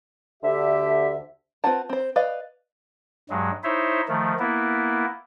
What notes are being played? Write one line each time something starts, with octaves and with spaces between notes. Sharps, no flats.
D2 D3 G4 E5
C4 F4 B4 F#5 A5
C4 C5
B4 D5 D#5 F5
G2 F#3 G#3
D#4 E4 C5 C#5 E5
D#3 F3 A3
A#3 B3 E4